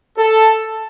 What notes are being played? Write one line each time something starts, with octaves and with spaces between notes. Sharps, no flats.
A4